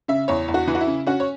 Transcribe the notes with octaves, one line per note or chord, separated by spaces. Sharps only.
C#3 E5
E2 C#5
E2
F#4
E3
F#4
E4
C#3
C#4 F#4
C#5